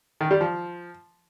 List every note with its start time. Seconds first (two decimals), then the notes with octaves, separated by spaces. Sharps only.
0.21 D#3
0.31 G3
0.41 F3